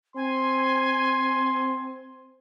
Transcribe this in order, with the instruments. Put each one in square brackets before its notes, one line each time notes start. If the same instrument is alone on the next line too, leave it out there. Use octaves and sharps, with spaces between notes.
[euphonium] C4 [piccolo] G#5 [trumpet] C6